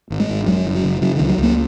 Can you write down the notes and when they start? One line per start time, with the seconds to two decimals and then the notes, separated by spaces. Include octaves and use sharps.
0.10 G#1
0.20 G#3
0.29 G#1
0.46 F#2 F#3
0.65 F#1
0.75 F#3
0.84 C#3
1.01 C#3 F#3
1.16 C#2 D#3
1.29 F#3
1.38 C#2 A#3